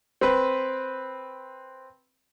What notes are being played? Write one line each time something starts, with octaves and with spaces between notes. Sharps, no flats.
C4 B4